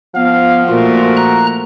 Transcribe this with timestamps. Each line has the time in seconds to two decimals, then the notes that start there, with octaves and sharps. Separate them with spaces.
0.16 F3 B3 F5
0.69 A#2 A3 F4 F#4 A#4
1.17 A#5 F#6